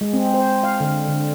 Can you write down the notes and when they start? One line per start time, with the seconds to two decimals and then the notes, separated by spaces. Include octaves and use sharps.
0.01 G#3
0.13 C4
0.34 C5
0.63 F5
0.80 D3
1.08 D3